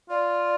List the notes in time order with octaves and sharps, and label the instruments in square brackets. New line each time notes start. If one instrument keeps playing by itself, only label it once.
[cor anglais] F4 [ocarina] D5